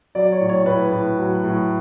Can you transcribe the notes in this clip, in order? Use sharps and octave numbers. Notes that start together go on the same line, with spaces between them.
F#3 D5
C#5
A2
C#5
A2 B4
A2
F#3
A2